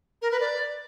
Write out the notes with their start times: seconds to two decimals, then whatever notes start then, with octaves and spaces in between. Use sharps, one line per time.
0.22 A#4
0.31 B4
0.41 D5